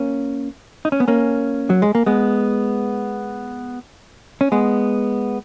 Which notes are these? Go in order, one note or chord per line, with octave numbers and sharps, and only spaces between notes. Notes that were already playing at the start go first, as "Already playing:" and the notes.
Already playing: A#3 C#4
D#4
C#4
B3
A#3 C#4
F#3
G#3
A#3
G#3 B3
C#4
G#3 B3